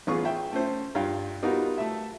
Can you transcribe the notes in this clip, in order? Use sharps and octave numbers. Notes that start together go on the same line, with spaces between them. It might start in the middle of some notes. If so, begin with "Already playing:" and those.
A1 B3 F4 G#4 C#6
E5 G5
A3 C#4 C5
G2 F4 F5 G5
G3 B3 D#4 F4 F#4 A#4
A3 E5